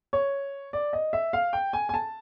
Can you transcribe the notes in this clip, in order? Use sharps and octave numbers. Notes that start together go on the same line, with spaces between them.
C#5
D5
D#5
E5
F5
G5
G#5
G#5
A5